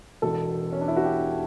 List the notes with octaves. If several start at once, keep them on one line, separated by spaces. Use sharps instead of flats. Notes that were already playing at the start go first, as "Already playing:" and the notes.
E1 E2 B2 A4
C#4
D4
E4
F#4
G4